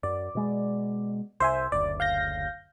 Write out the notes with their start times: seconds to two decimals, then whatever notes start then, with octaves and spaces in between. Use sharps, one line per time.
0.03 F#2 D5
0.35 B2 G#3
1.40 C2 C5 E5 G#5
1.72 F#1 D2 D5
2.00 F5 G6 A#6